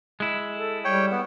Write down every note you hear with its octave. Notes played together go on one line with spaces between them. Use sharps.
G#3 E4
A4
G3 C#5 G5
B3